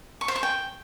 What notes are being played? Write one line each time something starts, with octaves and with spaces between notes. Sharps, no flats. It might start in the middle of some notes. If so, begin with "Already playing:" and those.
C#6
C5
C#6
G5